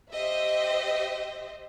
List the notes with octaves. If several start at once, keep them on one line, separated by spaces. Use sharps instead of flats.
G4 C5 D#5 E5